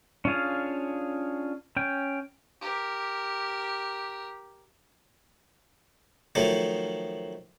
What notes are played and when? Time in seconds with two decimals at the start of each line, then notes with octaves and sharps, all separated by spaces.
0.25 C#4 D4 F4 G#4 F5
1.77 C#4 G5
2.61 G4 A#4
6.35 D#3 F3 F#3 A3